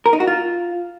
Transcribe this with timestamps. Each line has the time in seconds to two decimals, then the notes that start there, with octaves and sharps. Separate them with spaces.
0.06 A#4
0.13 D#4
0.20 F#4
0.27 F4